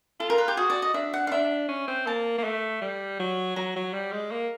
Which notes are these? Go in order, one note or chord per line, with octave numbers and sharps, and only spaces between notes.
F4 A4
A#4
B4
G4
F#4 G#4
D5
D#5
D4 E5
F#5
F5
D4 E5
C#4
C4
A#3 A5
A#3
A3
G3
F#3
F#3 A#5
F#3
G3
G#3
A#3